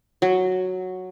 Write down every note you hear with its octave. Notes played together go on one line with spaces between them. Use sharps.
F#3